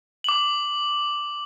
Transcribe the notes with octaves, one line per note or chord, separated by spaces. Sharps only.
D6 F#7